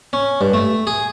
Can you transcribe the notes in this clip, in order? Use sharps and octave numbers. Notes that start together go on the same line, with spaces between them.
C#4
G2
A3
G#4